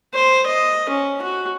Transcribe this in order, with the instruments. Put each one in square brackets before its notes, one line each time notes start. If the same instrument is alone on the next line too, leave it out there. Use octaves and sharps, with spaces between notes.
[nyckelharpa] C5
D#5
C#4
F#4